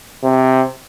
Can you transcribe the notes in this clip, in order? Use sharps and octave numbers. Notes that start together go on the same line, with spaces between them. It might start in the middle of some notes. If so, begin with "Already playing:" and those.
C3